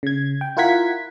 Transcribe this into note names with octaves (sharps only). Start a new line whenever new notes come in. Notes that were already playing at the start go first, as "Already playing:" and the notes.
C#3 G#6
G5
E4 F4 A#4 F#5 G#6 B6